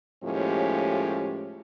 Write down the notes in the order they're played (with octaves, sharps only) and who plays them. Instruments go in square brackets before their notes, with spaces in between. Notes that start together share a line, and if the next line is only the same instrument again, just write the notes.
[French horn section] D#2 A2 F3 G#3 C#4 G4